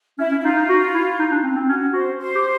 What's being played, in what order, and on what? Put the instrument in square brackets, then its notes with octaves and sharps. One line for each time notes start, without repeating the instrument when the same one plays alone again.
[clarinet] C#4 [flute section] E4
[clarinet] C#4
[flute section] E4
[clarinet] D#4 [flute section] F4
[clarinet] D#4
F#4
E4
D#4
D4
C4
C4
[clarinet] C#4 [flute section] F#4
[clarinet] F#4 [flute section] C5
[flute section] C5
[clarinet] G4